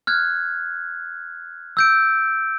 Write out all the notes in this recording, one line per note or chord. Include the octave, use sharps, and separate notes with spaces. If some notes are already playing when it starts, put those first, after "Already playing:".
F6 F#6 G#6
E6 G6 D7